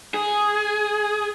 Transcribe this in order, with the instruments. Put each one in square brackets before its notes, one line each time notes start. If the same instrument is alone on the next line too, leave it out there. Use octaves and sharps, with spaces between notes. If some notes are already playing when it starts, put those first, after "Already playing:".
[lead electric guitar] G#4